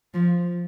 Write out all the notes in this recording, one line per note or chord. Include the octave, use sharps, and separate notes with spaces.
F3